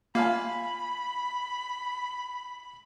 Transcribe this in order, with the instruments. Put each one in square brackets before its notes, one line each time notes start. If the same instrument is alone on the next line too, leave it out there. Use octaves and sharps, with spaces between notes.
[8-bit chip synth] A#3 [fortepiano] F4 F5 G#5 [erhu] B5